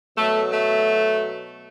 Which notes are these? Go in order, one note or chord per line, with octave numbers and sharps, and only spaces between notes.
B2 F#3 A3
A3